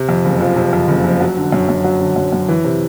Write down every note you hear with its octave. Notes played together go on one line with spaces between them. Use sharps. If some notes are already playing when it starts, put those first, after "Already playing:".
Already playing: C3
F2
F#1
F3
C3
F2
F#1
F3
F#3
D3
F#2
F#2
F#3
D3
F#2
F#2
E3
C3